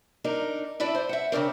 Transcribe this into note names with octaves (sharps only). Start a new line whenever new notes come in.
D4 D#4 A#4
D4 E4 B4 D5 E5
C5
E5 F#5
C#3 C4 D4 A#4